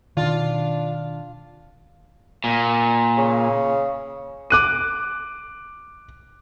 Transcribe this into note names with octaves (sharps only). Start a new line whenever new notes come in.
B2 D#3 D4 F4
A#2
C#3
D6 F#6 D#7